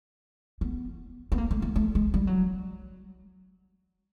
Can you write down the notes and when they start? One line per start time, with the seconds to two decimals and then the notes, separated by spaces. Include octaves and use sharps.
0.61 B3
1.32 B3
1.38 A#3
1.51 A3
1.62 A#3
1.76 A3
1.95 G#3
2.14 G3
2.27 F#3